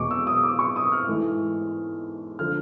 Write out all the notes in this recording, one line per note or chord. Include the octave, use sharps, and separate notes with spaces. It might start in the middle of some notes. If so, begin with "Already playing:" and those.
Already playing: E2 B2 G#3 C#6 D6
E6
D#6
D6
C#6
D#6
F6
G#2 E3 A3
D3 F3 F6